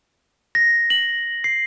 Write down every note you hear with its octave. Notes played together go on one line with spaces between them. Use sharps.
A#6
F#7
C7